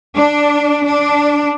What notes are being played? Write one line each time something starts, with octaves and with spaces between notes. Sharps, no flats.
D4
D4